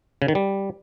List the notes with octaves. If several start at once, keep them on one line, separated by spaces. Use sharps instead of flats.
C#3
D#3
G3